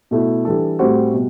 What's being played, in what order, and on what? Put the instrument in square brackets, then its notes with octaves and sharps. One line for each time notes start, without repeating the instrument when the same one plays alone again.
[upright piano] B2 A3 E4
E3 G3 D4 A4
A2 G3 C4 F#4 C5
B2 G3